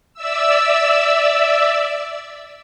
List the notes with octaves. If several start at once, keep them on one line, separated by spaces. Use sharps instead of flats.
D5 E5 E6